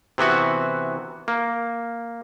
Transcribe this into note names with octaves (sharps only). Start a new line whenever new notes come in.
C3 E3 B3 F#4
A#3